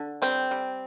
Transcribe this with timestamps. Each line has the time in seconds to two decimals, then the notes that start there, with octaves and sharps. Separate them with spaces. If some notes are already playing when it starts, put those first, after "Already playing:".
Already playing: D3
0.22 G3 C4
0.51 G3